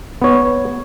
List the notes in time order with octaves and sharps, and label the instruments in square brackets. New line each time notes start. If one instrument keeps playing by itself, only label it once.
[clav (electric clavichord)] B3 C#5